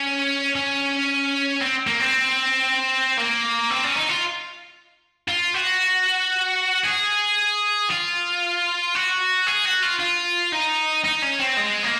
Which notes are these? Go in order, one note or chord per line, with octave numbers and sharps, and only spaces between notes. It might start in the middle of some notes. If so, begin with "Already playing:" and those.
Already playing: C#4
C#4
C4
A#3
C4
A#3
C4
C#4
D#4
F4
F4
F#4
G#4
F4
F#4
G#4
F#4
F4
F4
D#4
D#4
C#4
C4
G#3
A#3